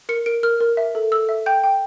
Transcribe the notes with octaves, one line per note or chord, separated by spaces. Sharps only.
A#4 C#7
A#4 D7
A#4 F6
A#4
E5
A4
A4 E6
E5
G5 G6
G5